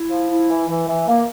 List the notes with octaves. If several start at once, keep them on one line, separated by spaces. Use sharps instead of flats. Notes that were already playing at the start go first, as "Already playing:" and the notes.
Already playing: E4
F3
E4
E3
E3
E3
A#3